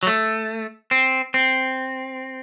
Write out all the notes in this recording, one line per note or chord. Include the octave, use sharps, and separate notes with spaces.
F#3
A3
C4
C4